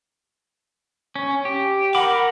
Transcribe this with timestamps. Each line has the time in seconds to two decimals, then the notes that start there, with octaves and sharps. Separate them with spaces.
1.16 C#4
1.45 G4
1.95 A#4 F#5 B5 D6